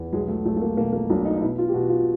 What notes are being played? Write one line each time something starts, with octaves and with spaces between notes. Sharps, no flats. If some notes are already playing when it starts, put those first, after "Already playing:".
Already playing: E2
B1 G#3
A3
B1 A3
A3
A#3
B2 A#3
A#3
B1 D4
D#4
D#4
B2 E4
F4
G4
B2 F#4
F4